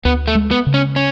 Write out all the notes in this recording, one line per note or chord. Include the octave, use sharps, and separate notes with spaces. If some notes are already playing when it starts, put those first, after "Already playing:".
D2 B3
A3
G#3
B3
C#3
C#4
C#4